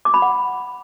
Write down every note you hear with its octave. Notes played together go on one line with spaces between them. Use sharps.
D6
B5
F#5